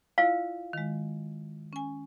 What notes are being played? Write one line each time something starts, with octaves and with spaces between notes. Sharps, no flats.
E4 F4 D5 F5
D#3 G#3
C#4 G#5